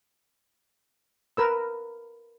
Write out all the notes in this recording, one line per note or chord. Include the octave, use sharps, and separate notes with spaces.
A#4 B4 E6